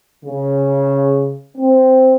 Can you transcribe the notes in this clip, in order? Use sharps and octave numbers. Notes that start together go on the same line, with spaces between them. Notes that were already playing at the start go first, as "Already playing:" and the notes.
C#3
C4